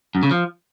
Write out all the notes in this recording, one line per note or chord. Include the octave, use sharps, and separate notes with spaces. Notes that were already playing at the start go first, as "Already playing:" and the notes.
F#2
C#3
F3